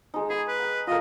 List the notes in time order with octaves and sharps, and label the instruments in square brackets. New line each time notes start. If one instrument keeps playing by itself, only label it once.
[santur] G#3 D#4
[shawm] G#4 [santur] B5
[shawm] B4
[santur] G5
[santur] F4 A#4 [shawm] D#5